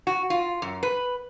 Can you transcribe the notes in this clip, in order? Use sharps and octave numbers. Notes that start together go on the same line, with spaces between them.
F#4
F4
F#2
B4